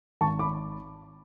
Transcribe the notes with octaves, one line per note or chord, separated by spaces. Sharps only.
G#1 A5 C#6
B5 D6